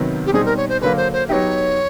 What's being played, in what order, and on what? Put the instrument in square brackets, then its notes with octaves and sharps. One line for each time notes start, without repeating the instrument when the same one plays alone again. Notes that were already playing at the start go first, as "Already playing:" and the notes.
Already playing: [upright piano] C3 D#3 F#3 B3
[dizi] G4
[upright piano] B2 G3 C4 D#4 [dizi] G#4
[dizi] A#4
C#5
C5
[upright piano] D3 F#3 A#3 [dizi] B4
[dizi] C5
C5
[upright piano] F#3 B3 D#4 G4 [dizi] C#5 E5